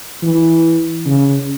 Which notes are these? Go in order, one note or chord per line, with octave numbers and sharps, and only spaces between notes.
E3
C#3